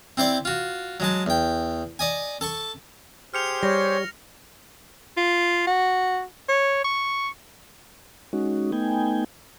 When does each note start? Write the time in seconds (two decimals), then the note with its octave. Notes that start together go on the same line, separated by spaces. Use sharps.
0.17 C4 E4 C5 D5
0.45 F4 F#4
1.00 F#3 G#3 A5
1.26 E2 G5
1.99 D5 D#5 G#5
2.41 A4 A5 C#6
3.34 G4 G#4 C5 F6 C#7 F7
3.63 G3 C#5 A#6
5.17 F4
5.67 F#4
6.49 C#5
6.84 C#6
8.33 G#3 C#4 D#4 F#4
8.72 A3 B3 D#4 G5 G#5